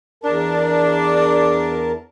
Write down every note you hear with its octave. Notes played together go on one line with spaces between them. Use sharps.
E2 D4 A#4 A5